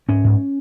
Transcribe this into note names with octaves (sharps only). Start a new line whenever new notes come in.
G#2 C#4
G#2